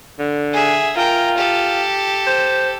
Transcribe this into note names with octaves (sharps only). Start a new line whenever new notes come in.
D3
G#4 E5
F4 A#4 G5
G4 A4
C5